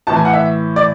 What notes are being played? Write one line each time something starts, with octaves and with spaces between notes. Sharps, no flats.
A2 E3 A5
G#5
F#5
E5
D5